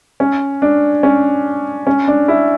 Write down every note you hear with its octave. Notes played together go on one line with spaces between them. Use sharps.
C#4
D4
C#4
C#4
D4
E4